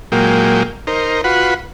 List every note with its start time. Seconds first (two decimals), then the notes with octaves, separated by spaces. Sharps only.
0.12 A#2 F#3 G#3 A#3 G5
0.87 D#4 A#4 C5
1.24 F4 F#4 B4 F#5 B5